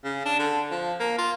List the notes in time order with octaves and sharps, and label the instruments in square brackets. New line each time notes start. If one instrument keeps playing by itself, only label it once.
[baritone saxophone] C#3
D4
D3
F3
A#3
F4